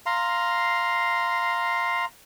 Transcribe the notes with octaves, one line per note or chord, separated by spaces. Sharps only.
F5 A#5 C6